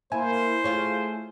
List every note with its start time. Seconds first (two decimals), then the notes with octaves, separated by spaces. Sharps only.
0.12 A#3 E4 C5 G#5
0.64 A3 F4 G#4 C#5